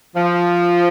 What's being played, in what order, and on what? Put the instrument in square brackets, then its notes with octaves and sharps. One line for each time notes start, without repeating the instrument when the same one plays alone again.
[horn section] F3